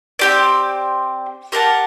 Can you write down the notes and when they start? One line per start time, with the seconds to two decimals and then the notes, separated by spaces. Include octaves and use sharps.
0.19 C4 G4 D5
1.52 G4 A#4 F#5 A5